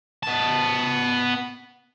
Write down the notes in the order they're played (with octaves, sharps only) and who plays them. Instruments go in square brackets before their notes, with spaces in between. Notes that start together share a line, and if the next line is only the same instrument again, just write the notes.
[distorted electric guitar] B3 A5